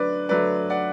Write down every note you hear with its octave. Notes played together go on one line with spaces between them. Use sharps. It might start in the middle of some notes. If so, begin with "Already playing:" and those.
Already playing: D3 F#3 A3 B4 D5
D3 F#3 A3 B4 D5
D5 F#5